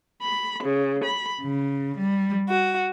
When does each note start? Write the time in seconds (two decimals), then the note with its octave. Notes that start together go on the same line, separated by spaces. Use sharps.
0.21 B5
0.63 C#3
1.04 B5
1.41 C#3
1.97 G3
2.49 F#4